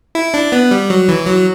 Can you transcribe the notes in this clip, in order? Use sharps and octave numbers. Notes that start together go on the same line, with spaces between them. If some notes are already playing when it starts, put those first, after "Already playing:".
E4
D4
B3
G3
F#3
E3
F#3